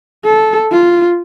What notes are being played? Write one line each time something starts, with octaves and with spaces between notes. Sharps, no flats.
A4
F4